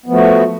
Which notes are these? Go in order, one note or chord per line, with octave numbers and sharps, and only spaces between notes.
F3 A3 B3 F#4